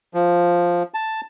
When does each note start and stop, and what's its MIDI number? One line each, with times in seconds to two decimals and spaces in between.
0.14 0.83 53
0.94 1.21 81